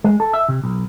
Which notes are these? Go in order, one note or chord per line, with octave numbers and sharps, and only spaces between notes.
G#3
A4
E5
C3
B1